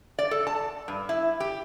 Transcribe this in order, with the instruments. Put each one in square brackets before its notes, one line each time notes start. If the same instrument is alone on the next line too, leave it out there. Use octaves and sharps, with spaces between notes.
[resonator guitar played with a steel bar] D5
A4
A5
G2
E4
G4